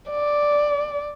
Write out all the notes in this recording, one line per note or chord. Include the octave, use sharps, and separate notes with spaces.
D5